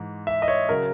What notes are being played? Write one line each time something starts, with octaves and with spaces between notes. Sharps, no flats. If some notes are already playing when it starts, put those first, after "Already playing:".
Already playing: G#2 E3
E5
D#5
C#5
C#3 F#3 A#4